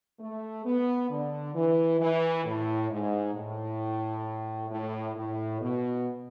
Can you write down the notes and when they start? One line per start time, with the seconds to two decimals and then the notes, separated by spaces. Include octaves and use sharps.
0.20 A3
0.65 B3
1.10 D3
1.55 E3
2.01 E3
2.45 A2
2.90 G#2
3.35 A2
4.70 A2
5.16 A2
5.61 B2